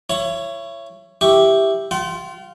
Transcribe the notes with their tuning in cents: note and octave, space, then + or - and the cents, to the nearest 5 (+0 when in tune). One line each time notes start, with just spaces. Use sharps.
E4 +35 C#5 +0
E4 +0 G4 +0 C#6 +10
F4 +0 G5 -45